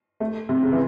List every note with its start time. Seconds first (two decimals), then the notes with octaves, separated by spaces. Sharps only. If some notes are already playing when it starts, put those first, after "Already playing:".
0.20 A3
0.49 C3
0.63 C#3
0.72 E3